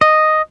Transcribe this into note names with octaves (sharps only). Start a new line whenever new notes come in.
D#5